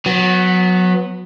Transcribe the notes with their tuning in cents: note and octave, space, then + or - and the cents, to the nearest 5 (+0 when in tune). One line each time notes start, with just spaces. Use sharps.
F#3 -25 B3 +0